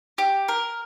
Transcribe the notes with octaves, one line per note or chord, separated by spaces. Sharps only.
G4
A#4